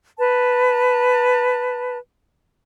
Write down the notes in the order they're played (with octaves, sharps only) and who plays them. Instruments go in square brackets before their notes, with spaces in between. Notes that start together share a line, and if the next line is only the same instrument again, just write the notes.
[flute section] B4 A5